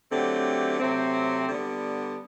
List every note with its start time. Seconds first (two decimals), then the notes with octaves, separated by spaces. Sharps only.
0.11 D3 F#3 A3 C4 G4
0.80 C3 F#3 A3 C4
1.48 D3 G3 B3